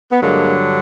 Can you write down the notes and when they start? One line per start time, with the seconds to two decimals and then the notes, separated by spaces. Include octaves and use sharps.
0.11 B3
0.21 G2 D3 F#3 G#3 A#3